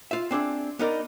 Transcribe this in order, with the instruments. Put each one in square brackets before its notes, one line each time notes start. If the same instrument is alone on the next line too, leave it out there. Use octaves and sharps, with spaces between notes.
[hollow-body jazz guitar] F4 E5
C4 D4 G#4 E5
B3 D#4 A#4 D5